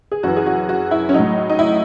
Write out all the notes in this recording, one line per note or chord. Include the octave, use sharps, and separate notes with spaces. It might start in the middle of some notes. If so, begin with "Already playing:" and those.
G#4
F#2 E3 F#4
G#4
F#4
F#4
E4
C#4
A2 F#3 D#4
D#4
E4